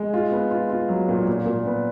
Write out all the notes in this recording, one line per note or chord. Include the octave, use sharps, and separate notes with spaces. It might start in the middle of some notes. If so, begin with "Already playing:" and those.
Already playing: G#3
F4
B3
F4
F4
F#3
A#2
A#2
A#2
B3